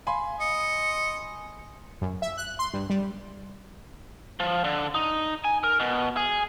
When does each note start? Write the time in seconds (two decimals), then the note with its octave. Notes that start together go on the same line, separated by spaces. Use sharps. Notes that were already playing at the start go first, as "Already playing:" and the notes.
0.07 F5 G#5 B5 C6
0.40 D#5 C#7
2.02 F#2
2.22 E5
2.38 F#6
2.59 C6
2.73 G2
2.90 G3
4.40 F3
4.64 D3
4.94 D#4
5.45 G#5
5.64 A#4
5.80 B2
6.17 G#4